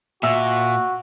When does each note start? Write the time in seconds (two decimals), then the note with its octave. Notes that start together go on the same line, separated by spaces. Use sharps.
0.23 A#2 F#4 E5 E6